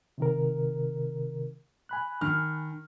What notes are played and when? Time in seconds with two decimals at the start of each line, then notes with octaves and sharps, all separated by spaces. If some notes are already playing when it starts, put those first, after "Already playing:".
0.18 C3 D#3 A#4
1.89 G#5 B5 F#6
2.21 D#3 F6